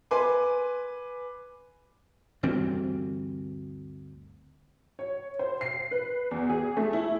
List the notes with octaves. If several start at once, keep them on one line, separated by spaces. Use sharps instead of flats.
B4 G#5 C6 D6
D2 G2 E3 C4
C#5
C5
C7
B4
E2
G#4
A3
E4